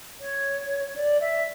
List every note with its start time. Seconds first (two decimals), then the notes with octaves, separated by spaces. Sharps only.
0.20 C#5
0.95 D5
1.20 E5